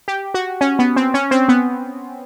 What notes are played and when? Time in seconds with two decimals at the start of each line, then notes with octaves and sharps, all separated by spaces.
0.08 G4
0.34 F#4
0.61 C#4
0.79 B3
0.96 C4
1.14 C#4
1.31 C4
1.49 B3